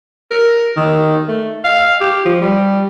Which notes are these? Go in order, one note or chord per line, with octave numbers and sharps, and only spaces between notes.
A#4
D#3
A3
F5
G4
F3
G3